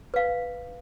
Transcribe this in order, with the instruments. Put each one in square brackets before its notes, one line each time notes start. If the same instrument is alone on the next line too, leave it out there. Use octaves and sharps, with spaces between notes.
[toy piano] B4 F5